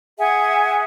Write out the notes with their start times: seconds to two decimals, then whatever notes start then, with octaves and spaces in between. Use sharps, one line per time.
0.19 G#4 E5 F#5 G#5